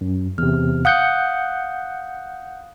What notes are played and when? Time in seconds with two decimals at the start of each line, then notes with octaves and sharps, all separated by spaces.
0.01 F#2
0.38 E2 C3 F6
0.85 F5 F#5 D#6 F#6 G6 C#7